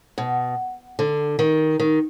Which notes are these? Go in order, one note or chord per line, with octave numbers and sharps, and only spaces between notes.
B2
D3
D#3
D#3